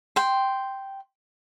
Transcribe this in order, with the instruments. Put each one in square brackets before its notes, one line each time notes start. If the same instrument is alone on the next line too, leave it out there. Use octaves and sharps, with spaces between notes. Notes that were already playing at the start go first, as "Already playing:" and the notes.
[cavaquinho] G5 C6